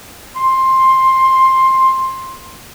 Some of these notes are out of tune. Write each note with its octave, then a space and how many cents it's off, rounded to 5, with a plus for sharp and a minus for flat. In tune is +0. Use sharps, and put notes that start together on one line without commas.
C6 +10